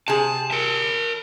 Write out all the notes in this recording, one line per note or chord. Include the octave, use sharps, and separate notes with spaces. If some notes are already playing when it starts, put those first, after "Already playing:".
C3 G#4 A5
A#4 A5